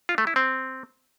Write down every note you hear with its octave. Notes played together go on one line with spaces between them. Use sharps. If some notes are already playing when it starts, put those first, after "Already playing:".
F4
A3
E4
C4